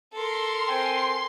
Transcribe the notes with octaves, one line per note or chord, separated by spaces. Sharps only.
A4 A#4 C6
C4 G5 G#5